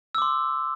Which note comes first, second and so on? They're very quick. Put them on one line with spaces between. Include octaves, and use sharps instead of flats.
E6 D6 C6